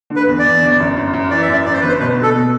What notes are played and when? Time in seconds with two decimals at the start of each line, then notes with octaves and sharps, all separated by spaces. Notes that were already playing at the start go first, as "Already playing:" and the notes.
0.10 D3
0.16 B4
0.27 E2
0.39 D5
0.45 E2
0.62 G1
0.80 F#2
0.96 F#2
1.13 F#2
1.31 E3 D5
1.42 E5
1.48 F#2 D5
1.66 F#2 D5
1.73 C5
1.81 G1 B4
1.88 C5
2.00 B2 B4
2.17 B2
2.23 A4
2.35 B2